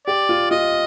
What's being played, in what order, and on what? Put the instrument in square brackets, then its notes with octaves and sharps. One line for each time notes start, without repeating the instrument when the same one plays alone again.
[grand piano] G4 [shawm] D5
[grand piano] F4
[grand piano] F4 [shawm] D#5